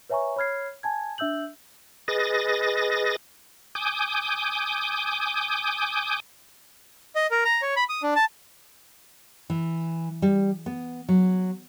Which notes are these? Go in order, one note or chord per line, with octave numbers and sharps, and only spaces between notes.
B4 C#5 E5 G#5 A#5 C#6
C#5 B5 F6 G#6 C7
G#5 A5 G#6
D4 E5 E6 G6 F#7
G#4 B4 D#5 A6 A#6
G#5 D6 D#6 G6
D#5
A#4
A#5
C#5
B5
D#6
D4
A5
E3
G3
B3
F#3